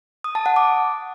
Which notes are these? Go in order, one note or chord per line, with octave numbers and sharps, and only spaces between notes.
D#6
A5
F#5
D6